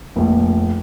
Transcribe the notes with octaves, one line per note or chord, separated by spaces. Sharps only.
F1 A#1